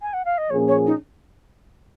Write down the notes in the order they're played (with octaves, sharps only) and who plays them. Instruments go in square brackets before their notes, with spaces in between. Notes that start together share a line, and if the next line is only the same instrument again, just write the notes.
[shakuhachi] G#5
F#5
F5
D#5
[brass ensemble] A#2 F3 A#3 C#4 G#4 [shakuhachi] C#5
[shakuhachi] C#5
D#4